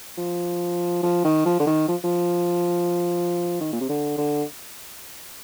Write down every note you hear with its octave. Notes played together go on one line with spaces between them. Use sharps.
F3
F3
D#3
F3
D3
D#3
F3
F3
D#3
A#2
C3
D3
D3